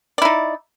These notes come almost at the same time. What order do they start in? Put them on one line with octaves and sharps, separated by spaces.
D5 E4 D#4